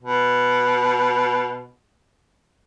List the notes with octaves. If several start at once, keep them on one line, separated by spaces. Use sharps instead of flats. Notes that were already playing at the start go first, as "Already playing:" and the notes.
B2